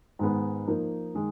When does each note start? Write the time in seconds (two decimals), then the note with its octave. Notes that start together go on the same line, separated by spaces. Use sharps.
0.19 G#2 D#3 G#3 B3
0.67 F3 A#3 D#4 A#4
1.14 D#3 G#3